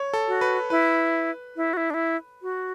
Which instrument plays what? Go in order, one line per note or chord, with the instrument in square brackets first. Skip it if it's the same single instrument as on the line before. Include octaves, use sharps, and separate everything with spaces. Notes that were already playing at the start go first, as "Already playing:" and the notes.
Already playing: [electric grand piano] C#5
A4
[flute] F#4
[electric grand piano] B4
[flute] E4 [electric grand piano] B4
[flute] E4
F#4
E4
D4
E4
F#4